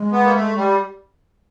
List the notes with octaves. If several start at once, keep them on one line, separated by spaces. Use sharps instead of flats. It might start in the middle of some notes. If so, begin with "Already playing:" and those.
Already playing: G#3
B3
A#3
A3
G3